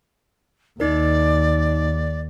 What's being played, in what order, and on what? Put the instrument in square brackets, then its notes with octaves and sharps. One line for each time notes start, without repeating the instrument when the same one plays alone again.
[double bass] D#2 [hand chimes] D#4 A#4 [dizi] D5